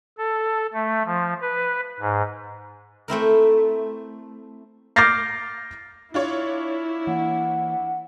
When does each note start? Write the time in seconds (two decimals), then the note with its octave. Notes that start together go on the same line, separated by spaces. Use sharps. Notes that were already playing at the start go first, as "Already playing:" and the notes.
0.18 A4
0.73 A3
1.05 F3
1.41 B4
2.00 G#2
3.08 A3 C4 E4 A#4
4.96 D6 F6 G6 A6 A#6 C7
6.14 D4 E4 F4 C#5
7.07 E3 A#3 F#5